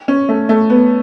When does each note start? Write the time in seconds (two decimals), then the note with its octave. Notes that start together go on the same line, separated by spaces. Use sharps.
0.08 C#4
0.29 A3
0.49 A3
0.70 B3